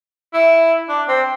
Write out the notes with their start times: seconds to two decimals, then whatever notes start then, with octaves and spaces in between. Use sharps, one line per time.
0.34 E4
0.89 D4
1.08 C4